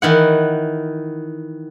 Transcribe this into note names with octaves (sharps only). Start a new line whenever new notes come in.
D#3 E3 F#5